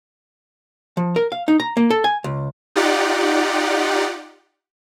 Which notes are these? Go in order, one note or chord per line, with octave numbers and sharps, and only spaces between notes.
F3
A#4
F5
D#4
A#5
A#3
A4
G#5
C#2
D#4 F4 G4 D5 F#5